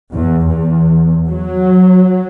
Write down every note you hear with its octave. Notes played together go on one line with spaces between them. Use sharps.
E2
E2
F#3